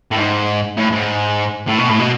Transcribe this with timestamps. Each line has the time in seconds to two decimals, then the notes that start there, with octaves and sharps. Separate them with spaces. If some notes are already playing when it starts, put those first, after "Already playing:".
0.11 A2
0.17 G#2
0.77 A2
0.92 G#2
1.67 A2
1.78 B2
1.89 A2
2.00 B2